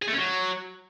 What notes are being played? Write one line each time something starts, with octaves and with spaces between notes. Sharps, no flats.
G#4
A3
C#4
F#3